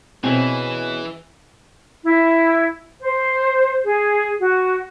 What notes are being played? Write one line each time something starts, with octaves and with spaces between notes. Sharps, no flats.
B2 E3 C4 C#4 G#4
E4
C5
G#4
F#4